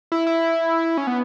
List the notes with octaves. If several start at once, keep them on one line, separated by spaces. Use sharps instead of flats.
E4
E4
C#4
B3